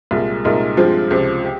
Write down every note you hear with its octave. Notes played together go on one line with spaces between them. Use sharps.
C2 A#2 G#3
C2 A#2 G#3 D#4 A#4
G2 F3 G#3 C4 F4
C#2 C3 F3
G4